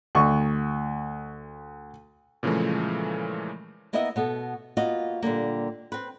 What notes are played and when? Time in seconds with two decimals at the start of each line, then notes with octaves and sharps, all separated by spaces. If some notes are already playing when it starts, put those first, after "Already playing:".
0.15 D2 C#6
2.43 A#2 C#3 E3 F3 G#3 A3
3.93 A#3 B3 E4 A#4 D#5 E5
4.16 B2 B3 A4
4.77 A#3 B3 F4 F#4 D#5
5.22 A#2 D3 G3 A#3
5.92 C4 B4